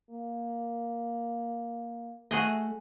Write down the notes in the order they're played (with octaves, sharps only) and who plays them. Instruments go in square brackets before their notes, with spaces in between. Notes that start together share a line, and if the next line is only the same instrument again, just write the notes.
[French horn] A#3
[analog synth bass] A3 [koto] F#4 G#4 D#5